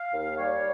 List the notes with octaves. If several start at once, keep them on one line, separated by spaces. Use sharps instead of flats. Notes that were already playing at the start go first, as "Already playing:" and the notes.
Already playing: F5
D#2
G3 C#5